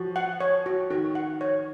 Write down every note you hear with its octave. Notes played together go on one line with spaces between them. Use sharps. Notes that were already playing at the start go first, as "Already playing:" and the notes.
Already playing: F3 F#4
F#5
C#5
F#4
D#3 F#4
F#5
C#5